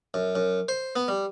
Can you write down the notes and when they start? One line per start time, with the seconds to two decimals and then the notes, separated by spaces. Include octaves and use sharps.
0.14 F#2
0.35 F#2
0.69 C5
0.96 B3
1.08 G3